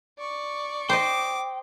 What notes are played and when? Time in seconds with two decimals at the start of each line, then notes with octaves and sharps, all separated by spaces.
0.19 D5 C#6
0.90 C5 D#5 G5 D6